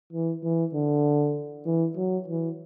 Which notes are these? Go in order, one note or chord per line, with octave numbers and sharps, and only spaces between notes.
E3
E3
D3
E3
F#3
E3